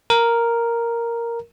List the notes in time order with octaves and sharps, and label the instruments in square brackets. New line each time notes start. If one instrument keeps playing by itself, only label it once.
[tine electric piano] A#4